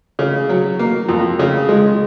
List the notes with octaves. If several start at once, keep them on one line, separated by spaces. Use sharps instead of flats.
C#3
F#3
A#3
F2
C#3
G#3